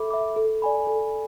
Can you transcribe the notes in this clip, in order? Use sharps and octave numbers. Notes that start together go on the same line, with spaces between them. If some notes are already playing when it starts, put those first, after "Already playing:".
Already playing: A4 E5 B5 D6
E5 B5 D6
A4
D5 G#5 B5
A4